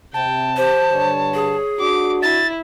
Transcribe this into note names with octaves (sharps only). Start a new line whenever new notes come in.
C3 G5 A5
G4 C5
G2 D3 C#5
G#4
D4 F#4 D6
E4 A6